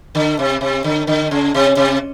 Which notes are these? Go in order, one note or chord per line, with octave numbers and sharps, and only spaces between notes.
D3
C3
C3
D3
D3
C#3
C3
C3